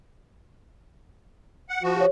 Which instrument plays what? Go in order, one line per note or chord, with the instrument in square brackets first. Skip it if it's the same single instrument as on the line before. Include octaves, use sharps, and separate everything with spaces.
[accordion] F#5
F3 F#4
[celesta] G4 C#5